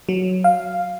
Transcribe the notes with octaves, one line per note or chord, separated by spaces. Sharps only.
F#3
F5